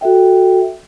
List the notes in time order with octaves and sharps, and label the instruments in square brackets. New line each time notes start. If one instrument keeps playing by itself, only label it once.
[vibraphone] F#4 A4 E5 G5